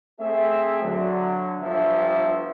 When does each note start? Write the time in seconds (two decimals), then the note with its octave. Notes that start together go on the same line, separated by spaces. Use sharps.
0.20 A3 C4 G#4 E5
0.83 D3 F#3
1.61 G1 G2 F3 A4 E5